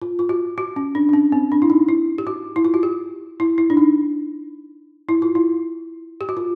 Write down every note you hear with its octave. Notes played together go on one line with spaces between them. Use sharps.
F4
F4
F#4
F#4
C#4
D4
D4
C#4
C4
D4
E4
D#4
E4
G4
F#4
E4
F4
F#4
G4
E4
E4
D4
D#4
E4
F4
E4
G4
F#4
F4